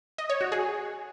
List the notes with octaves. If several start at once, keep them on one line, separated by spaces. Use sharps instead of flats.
D#5
C#5
F#4
G#4